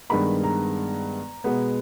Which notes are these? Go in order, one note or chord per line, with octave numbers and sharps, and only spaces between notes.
G2 D#3 G#3 B3 B5
A#5
B2 G#3 B3